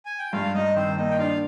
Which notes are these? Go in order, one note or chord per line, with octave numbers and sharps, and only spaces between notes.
G#5
G5
G2 F4 F5
G2 D#4 D#5
D#3 C4 C5
A#3 D#4 D#5
G5
D4 F4 F5